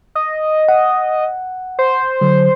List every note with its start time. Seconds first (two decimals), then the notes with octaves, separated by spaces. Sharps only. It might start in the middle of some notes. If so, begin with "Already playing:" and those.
0.15 D#5
0.69 F#5
1.79 C5
2.21 D3 F#3